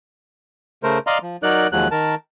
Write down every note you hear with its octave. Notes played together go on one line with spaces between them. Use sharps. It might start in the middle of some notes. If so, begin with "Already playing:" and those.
C#3 A3 A#4 C5
D5 D#5 F5 A#5 C6
F3
F#3 D#4 A#4 D5 F#6
D#2 F3 F#3 G#3 F#6
D#3 A#4 A5